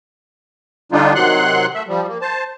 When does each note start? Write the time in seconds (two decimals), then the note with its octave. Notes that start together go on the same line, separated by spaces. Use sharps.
0.92 D3 G3 D4 D#4 F4
1.15 C3 D#3 F#3 F#5 C6 F#6
1.74 A3 E5
1.88 F3 G3
2.08 A#3
2.21 C5 A5